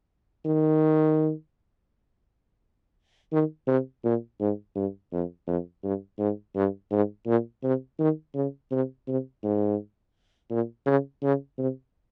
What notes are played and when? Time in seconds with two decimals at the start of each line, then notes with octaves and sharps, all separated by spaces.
0.45 D#3
3.33 D#3
3.68 C3
4.04 A#2
4.40 G#2
4.76 G2
5.12 F2
5.47 F2
5.84 G2
6.19 G#2
6.56 G2
6.91 G#2
7.27 A#2
7.63 C3
7.99 D#3
8.35 C#3
8.71 C3
9.08 C3
9.44 G#2
10.51 A#2
10.86 C#3
11.23 C#3
11.58 C3